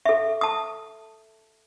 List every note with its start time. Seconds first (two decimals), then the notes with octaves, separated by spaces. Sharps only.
0.06 A4 E5
0.41 A5 D#6